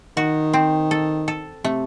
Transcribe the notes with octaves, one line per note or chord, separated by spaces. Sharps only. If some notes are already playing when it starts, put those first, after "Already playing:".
D#3 F#4
C4
A4
A4
C3 A3